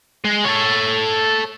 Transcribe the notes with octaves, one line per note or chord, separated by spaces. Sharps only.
G#3
A4 C#5